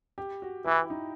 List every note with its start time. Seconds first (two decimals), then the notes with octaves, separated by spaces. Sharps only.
0.18 G4
0.42 F#4
0.66 E3 E4
0.90 D#4